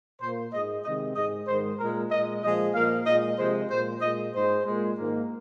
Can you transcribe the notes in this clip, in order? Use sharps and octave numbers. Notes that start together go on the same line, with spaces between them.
A#2 A#3 C5
G#2 G#3 D#5
C3 D#3 G#3 D#5
G#2 G#3 D#5
G#2 D#3 G#3 C5
A#2 G#3 A#4
A#2 G#3 D#5
A#2 F3 G#3 D#5
A#2 F3 A#3 F5
A#2 G#3 D#5
C3 F3 G#3 C5
A#2 G#3 C5
A#2 G#3 D#5
G#2 G#3 C5
A#2 G#3
G#2 D#3 A#3